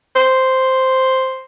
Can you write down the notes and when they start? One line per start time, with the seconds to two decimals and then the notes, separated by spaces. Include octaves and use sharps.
0.16 C5